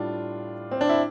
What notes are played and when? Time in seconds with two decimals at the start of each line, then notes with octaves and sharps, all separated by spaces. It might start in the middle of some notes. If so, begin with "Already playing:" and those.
Already playing: A2 G3 D4 F4
0.71 C4
0.81 D4
0.89 E4